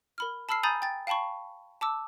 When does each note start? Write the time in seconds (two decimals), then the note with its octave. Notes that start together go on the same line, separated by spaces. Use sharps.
0.18 A#4 B5 F6
0.49 A5 B5 E6 F6 C7
0.63 G#5 A#5 B5 D#6 G6 A6
0.82 G5 A6
1.07 F5 G5 A5 B5 C#6
1.81 A5 D6 E6